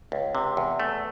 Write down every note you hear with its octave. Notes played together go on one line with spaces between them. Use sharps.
C#2
C3
E2
A3